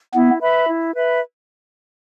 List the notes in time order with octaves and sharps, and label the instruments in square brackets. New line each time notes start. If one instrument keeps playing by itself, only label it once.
[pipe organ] B3 [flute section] E4
[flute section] B4 E5 B5
E4
B4 E5 B5